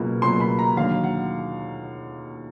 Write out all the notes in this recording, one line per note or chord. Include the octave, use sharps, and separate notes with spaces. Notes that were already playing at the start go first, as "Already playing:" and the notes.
Already playing: C#2 B2 F#3 A#3
C#2 B2 F#3 A#3 C6
B5
A#5
D#2 D3 F#3 F5
F#5